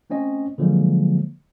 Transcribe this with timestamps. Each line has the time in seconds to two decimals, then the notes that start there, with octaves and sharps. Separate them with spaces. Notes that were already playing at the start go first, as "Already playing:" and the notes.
0.10 A3 C4 C#4 D#5
0.58 D3 F3 F#3 G#3 A#3